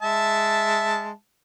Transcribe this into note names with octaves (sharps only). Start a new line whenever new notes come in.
G#3 E5 A5